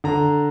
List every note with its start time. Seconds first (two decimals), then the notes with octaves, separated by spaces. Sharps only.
0.04 D3 A#5